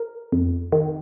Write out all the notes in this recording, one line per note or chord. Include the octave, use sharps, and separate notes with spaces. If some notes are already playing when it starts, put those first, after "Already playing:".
Already playing: A#4
F2
D#3